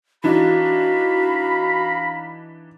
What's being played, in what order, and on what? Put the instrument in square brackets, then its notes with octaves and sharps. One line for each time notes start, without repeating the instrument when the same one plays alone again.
[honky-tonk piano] E3 D4 D#4 [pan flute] F#4 [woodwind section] F5 A#5 B5